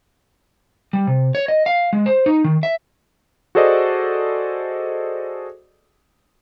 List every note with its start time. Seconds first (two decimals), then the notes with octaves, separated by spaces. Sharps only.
0.93 G3
1.07 C3
1.35 C#5
1.48 D#5
1.66 F5
1.93 G#3
2.06 C5
2.26 D#4
2.44 D#3
2.63 E5
3.55 F#4 G#4 A4 C5 D5 D#5